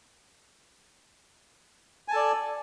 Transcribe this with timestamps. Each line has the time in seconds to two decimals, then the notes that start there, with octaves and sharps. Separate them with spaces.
2.08 G#5
2.11 A5
2.13 A4
2.16 D5